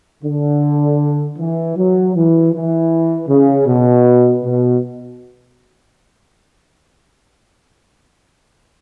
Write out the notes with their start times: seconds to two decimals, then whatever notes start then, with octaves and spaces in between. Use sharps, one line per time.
0.24 D3
1.38 E3
1.77 F#3
2.15 E3
2.53 E3
3.28 C#3
3.67 B2
4.44 B2